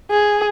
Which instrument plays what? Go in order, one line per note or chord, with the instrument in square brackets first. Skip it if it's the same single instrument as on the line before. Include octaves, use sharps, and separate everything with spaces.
[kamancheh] G#4